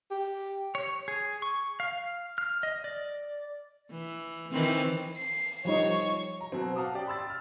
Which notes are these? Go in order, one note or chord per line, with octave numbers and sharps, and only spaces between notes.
G4
C#5
G#4
C#6
F5
F6
D#5
D5
E3
D#3 E3 C4
C7
F3 G3 D#4 C#5 C#6
A#5
B2 F#3 C4
F5 F#5 A5 A#5 D6 D#6
C#4 G4 D5 G5
B5 C6 E6 A6
B5 F6